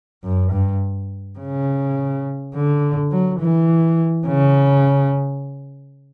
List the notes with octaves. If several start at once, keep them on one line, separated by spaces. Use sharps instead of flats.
F#2
G2
C#3
D3
F#3
E3
C#3